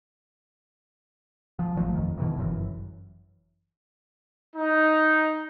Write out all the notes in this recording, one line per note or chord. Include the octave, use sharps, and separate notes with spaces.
F3
G#1 F3 F#3 A3
F2 D#3
B2 D#3 E3
G1 F#2 E3
D#4